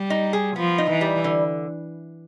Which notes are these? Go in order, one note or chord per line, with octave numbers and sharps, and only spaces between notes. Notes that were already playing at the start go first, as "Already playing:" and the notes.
Already playing: G3
D#4
G#4
F3 B3
D#4
E3
G3
D3